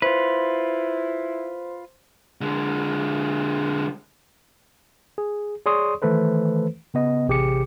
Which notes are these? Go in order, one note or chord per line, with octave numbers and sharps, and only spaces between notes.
E4 F4 B4 C5 C6
D3 G#3
G#4
G#4 C#5 D5 C6 C#6 D#6
D#3 E3 A3 A4 B4 C5
C#3 B3 D#5
A1 C3 G4 G#4 D6 C#7